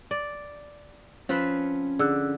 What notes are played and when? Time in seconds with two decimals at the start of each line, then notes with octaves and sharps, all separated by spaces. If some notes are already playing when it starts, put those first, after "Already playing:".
0.11 D5
1.29 F3 C4 C#4 B4
1.99 D3 G#4 E6 F#6